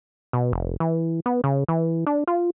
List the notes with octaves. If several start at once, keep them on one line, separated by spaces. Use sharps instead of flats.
B2
F1
E3
B3
C#3
E3
D4
F4